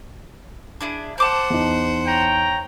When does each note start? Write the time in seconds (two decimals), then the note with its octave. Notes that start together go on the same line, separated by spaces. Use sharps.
0.81 D4 E4 G#4
1.18 C5 F#5 A5 D6 G6
1.50 E2 D#4
2.06 C#5 G5 A#5